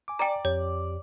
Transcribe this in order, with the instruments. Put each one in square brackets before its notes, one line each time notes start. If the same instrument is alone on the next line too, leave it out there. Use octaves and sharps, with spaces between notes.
[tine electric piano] G#5 D6
[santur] D5 [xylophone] G5 A#5
[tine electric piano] F2 G4 [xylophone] C#5